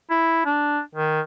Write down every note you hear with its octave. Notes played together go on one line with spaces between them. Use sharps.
E4
D4
D#3